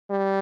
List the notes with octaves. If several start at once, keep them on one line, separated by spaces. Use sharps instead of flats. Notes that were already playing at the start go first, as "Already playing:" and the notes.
G3